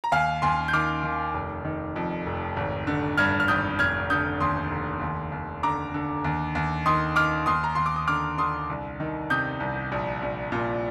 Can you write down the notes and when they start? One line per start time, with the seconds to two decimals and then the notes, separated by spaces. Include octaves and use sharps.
0.04 A#5
0.12 D#2 F5 G#5
0.42 D#2 G#5 C6
0.68 G6
0.73 D#3 D6 F6
1.03 D#3
1.34 F1
1.65 D#3
1.96 F2
2.26 F1
2.56 G#1
2.87 D3
3.18 G2 F6 G#6
3.40 F6
3.48 G#1 D#6 G6
3.79 F1 F6 G#6
4.10 D3 D#6 G6
4.40 D#2 C6 D#6
4.71 F1
5.01 D#2
5.32 D#2
5.63 D3 A#5 D6
5.94 D3
6.24 D#2
6.55 D#2
6.86 D#3 C6 D#6
7.16 D#3 D6 F6
7.46 D#2 C6 D#6
7.64 A#5
7.75 D#2 C6
7.86 D6
7.96 D#6
8.08 D3 D6 F6
8.38 D3 C6 D#6
8.69 C2
9.00 D#3
9.30 C3 D#6 G6
9.60 C2
9.92 A#1
10.22 A#1
10.52 A#2